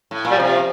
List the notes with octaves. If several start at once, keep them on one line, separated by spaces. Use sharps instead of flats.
A2
A#2
G3
C3 F3